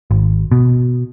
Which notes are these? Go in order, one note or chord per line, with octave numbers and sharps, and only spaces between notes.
G#1
B2